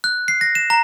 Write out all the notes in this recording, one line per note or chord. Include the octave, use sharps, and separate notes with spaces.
F#6
C7
A#6
E7
A#5